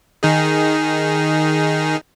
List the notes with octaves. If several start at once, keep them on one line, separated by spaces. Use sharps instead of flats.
D#3 D#4 G#4